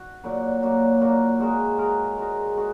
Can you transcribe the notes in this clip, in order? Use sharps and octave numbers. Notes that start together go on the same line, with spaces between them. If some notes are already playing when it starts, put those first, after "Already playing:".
Already playing: F#4
A#2 F#3 A#3 F#4
A#2 F#3 A#3 F#4
A#2 F#3 A#3 F#4
G#3 F#4 A#4
G#3 F#4 A#4
G#3 F#4 A#4
G#3 F#4